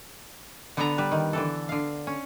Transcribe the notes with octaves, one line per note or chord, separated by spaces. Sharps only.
D3 B3 A4 B4 G#5 A#5
G3 B4
D#3
D3 E3 A4
D3 F5
C#4